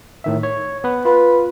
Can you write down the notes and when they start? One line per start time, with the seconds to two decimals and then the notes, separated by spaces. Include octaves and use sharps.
0.24 A2 D#3 E5
0.43 C#5
0.84 B3 B4
1.05 F4 B4